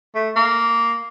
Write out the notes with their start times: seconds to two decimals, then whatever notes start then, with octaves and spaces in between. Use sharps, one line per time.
0.15 A3
0.36 A#3